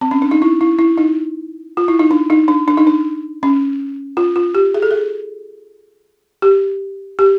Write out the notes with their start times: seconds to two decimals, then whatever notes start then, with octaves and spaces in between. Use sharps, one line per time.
0.01 C4
0.11 C#4
0.22 D4
0.31 D#4
0.42 E4
0.61 E4
0.79 E4
0.97 D#4
1.77 F4
1.88 E4
1.99 D#4
2.11 D4
2.30 D#4
2.48 D4
2.68 D4
2.77 D#4
2.87 D4
3.43 C#4
4.17 F4
4.36 F4
4.55 G4
4.74 G#4
4.82 A4
4.91 G#4
6.42 G4
7.19 G4